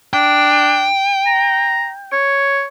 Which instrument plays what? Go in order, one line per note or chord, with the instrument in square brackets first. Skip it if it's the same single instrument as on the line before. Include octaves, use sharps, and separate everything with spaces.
[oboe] D4 [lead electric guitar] G5
[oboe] A#5
C#5